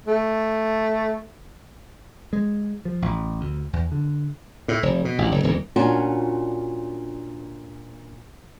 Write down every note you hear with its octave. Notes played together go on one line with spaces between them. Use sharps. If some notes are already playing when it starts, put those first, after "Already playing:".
A3
G#3
F3
A1
D2
E2
D3
A2
F1
B2
A1
F#1
D#1
A#2 C#4 D4 F4 F#4